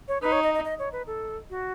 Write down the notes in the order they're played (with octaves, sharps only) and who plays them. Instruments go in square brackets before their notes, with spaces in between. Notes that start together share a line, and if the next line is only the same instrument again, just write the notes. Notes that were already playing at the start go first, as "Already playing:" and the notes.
[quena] C#5
[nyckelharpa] D#4 [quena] B4
[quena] C#5
D#5
D#5
D#5
C#5
B4
A4
F#4